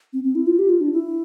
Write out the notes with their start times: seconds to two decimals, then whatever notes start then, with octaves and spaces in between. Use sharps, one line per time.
0.13 C4
0.24 C4
0.35 E4
0.47 F4
0.59 G4
0.70 F4
0.81 D4
0.93 E4